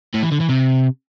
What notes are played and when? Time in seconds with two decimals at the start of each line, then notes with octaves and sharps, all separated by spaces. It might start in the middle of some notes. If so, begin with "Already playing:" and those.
0.14 A2
0.23 E3
0.32 D3
0.41 E3
0.49 C3